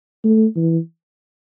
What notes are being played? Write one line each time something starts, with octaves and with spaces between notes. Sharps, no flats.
A3
E3